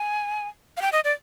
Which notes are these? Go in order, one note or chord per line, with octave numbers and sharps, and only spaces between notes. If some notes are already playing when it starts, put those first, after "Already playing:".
Already playing: G#5
F5
G5
D#5
D5